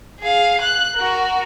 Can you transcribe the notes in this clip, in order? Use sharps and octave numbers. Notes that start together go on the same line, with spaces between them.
G#4 F5
F#6
F#4 A#4